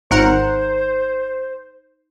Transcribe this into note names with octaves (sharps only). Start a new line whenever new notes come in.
G#1 D#4 A#4 C5 F#5